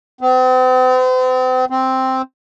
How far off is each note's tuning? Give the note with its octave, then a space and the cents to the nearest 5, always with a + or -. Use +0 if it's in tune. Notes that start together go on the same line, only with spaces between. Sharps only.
C4 -40
C4 +0